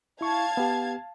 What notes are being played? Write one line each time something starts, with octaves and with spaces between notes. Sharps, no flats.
E4 F5 A5 C#6 G#6
B3 G4